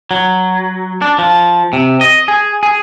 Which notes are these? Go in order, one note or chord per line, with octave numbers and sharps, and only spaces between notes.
F#3
D4
F3
C3
D#5
G#4
G#4